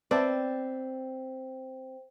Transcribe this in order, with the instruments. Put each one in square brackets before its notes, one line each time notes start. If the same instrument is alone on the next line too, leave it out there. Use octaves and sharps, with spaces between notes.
[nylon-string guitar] C4 [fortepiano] B4 E5 A5 [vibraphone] C5 G5 [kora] D5